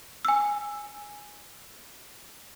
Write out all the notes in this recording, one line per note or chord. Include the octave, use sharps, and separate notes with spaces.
G#5 E6